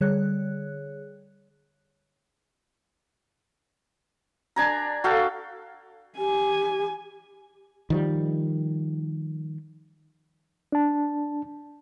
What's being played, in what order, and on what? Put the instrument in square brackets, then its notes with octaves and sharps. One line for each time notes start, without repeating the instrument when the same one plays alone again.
[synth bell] D3 G3 G#4 C#5 F#6
[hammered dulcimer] D4 G#5 A#5
F#4 A4 F5 G5
[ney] G4 [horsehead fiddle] G#5
[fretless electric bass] D#3 F3 G3
[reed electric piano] D4 A5